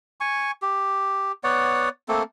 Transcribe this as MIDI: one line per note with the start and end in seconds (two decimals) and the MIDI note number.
0.20 0.51 80
0.20 0.51 85
0.62 1.32 67
1.44 1.89 59
1.44 1.89 73
1.44 1.89 74
1.44 1.89 78
2.08 2.23 57
2.08 2.23 58
2.08 2.23 60
2.08 2.23 69